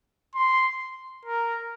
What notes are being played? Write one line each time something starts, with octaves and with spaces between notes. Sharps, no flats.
C6
A#4